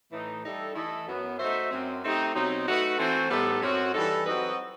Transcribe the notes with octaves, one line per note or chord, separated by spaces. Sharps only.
A2 E3 A3 D#4
G3 D#4 A4 E5
E3 A3 E4 A4 D#5
F#2 F#3 B3
A3 D#4 F#4 C5 E5
F#2 F#3 C4
A3 C4 D#4 G4
B2 F#3 C4 D#4
A3 D#4 F#4 B4
E3 A3 C4 F#4 C5
A2 G3 B3 D#4 A4
F#2 F#3 C4 F#4
E3 G3 D#4 A4
F#3 C4 F#4 B4 D#5